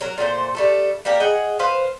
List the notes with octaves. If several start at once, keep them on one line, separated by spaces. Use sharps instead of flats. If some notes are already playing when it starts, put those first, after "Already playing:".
F#3 A#4
A#2 A3 G4 C5
G3 A3 A4
G3 A#3 G4 A#4
G#4 D#5 F#5 G5
B4 C5 F5